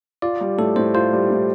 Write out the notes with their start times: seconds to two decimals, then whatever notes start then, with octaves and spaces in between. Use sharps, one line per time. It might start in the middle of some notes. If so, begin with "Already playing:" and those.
0.22 F4 D5
0.41 G3
0.58 A2 A4
0.76 A2 C5
0.94 F4 C5
1.13 G3
1.30 A2